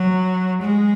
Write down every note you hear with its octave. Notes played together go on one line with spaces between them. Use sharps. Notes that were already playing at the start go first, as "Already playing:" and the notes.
Already playing: F#3
G#3